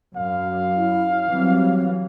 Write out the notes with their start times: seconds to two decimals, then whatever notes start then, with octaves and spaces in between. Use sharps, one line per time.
0.16 F#2 F5
0.75 E4
1.30 E3 F#3 G3 C4